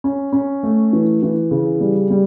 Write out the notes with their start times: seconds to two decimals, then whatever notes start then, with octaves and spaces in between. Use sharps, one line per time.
0.04 C#4
0.33 C#4
0.63 A3
0.93 E3
1.23 E3
1.51 C#3
1.81 G3
2.10 G3